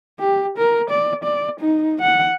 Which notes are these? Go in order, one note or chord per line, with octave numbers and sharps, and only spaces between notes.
G4
A#4
D5
D5
D#4
F#5